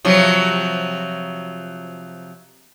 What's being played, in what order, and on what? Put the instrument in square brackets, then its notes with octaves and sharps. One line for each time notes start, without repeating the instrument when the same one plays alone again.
[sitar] C3 F3 F#3